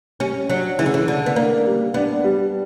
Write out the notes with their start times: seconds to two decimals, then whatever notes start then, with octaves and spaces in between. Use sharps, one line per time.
0.20 G3 C#4
0.49 F#3 D4
0.78 C#3 E3
0.86 D3
0.94 E3
1.08 D3 D4
1.26 B3
1.36 A#3 D4
1.66 G3
1.94 B3 D4
2.24 G3